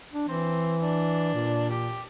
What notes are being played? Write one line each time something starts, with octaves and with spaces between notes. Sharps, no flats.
D4
E3 C4
D4
A#2
G4